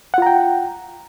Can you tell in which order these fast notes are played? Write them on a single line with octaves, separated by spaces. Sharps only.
F#5 F4 A#5 G5